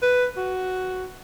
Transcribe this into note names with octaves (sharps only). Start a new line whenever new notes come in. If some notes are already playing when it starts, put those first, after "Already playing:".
B4
F#4